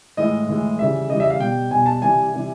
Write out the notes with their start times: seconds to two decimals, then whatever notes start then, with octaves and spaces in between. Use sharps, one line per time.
0.17 A2 E3 G#3 D#5
0.48 A2 E3 G#3
0.79 C#3 E3 G3 E5
1.09 C#3 E3 G3 D#5
1.20 E5
1.30 F5
1.40 B2 G3 G5
1.71 B2 G3 G#5
1.86 A5
2.02 C3 E3 G3 G#5
2.32 C3 E3 G3